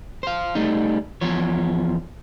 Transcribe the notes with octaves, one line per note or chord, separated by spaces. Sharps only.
C5 F5
G3 A3 D#4
E2 F3 C#5